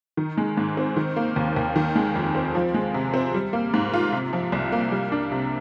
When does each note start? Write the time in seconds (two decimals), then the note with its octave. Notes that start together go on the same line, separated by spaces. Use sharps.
0.17 D#3
0.37 G#3
0.57 G#2
0.77 C4
0.96 D#3
1.16 A#3
1.36 D#2
1.56 D#2
1.76 D#3
1.95 G#3
2.15 F2
2.35 C4
2.55 F3
2.74 G#3
2.94 C3
3.14 C4
3.34 G3
3.53 A#3
3.74 G#2
3.93 F4
4.12 C3
4.33 F3
4.52 C2
4.72 A#3
4.92 G3
5.12 D4
5.32 C3